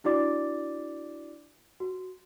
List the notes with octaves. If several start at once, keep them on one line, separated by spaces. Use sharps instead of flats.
D4 E4 F#4 D5 D6 A6
F#4